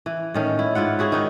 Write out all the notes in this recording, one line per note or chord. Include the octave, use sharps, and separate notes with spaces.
E3
A2 D#3 C#4
E4
G#2 E4 F4 F#5
E4 F#4 G#4 C#5
D#3 D#4 F#4